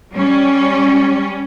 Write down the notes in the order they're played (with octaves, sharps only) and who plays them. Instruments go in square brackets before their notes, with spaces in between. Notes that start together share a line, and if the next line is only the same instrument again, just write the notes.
[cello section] G3 C#4